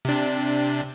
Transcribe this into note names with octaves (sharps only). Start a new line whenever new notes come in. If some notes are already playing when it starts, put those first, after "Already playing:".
C3 D4